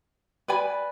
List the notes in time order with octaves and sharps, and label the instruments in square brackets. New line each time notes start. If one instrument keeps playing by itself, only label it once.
[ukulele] B4 D5 G#5 B5